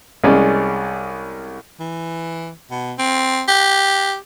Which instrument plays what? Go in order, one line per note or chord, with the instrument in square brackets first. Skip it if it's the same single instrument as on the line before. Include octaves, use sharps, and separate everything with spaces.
[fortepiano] C2 G#3 C#4 D5
[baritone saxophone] E3
B2
C4
G4